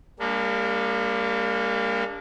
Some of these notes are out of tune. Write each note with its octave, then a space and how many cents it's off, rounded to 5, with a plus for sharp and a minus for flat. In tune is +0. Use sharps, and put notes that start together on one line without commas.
G3 +45 A#3 -10 D4 -25